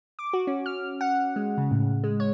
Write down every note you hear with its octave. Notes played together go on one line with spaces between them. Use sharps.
D6
F#4
C#4
F6
F#5
G#3
C#3
A2
G#3
C#5